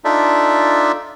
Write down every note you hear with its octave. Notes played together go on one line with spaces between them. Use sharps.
D4 D#4 F4 A4 D5 E5